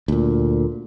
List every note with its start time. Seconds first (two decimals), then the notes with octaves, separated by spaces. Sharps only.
0.08 D2 A#2